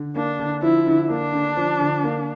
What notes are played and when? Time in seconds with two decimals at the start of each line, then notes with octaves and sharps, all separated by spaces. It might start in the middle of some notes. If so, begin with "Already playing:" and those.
Already playing: D3
0.16 A#3 D4
0.39 D3
0.62 F3 E4
0.87 D3
1.10 A#3 D4
1.34 D3
1.57 F3
1.81 D3
2.04 A#3